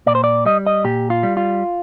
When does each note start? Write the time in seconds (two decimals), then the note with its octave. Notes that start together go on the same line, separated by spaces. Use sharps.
0.06 A#2 D5
0.15 C5
0.24 D5
0.45 G3 D#5
0.67 D#5
0.84 A#2 G4
1.10 F4
1.23 G3
1.37 F4